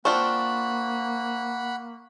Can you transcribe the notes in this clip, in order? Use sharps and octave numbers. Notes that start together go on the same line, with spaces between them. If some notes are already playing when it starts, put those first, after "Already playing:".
A#3 C4 D4 F4 F#5 B5 C#6